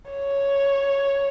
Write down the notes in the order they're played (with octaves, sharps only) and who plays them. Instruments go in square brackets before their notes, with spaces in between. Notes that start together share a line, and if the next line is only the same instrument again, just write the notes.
[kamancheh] C#5